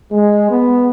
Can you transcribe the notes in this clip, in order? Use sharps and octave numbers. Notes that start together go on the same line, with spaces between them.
G#3
B3